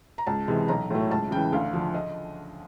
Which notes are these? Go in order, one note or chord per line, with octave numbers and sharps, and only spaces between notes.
A#5
C#2 A5
C3 E3 G#3
B1 A#5
A2 F#3 A3
C#2 A5
C#3 E3 G5
D2 F5
D3 F3
D#5